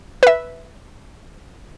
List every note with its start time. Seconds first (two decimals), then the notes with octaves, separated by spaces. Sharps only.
0.23 B4 E5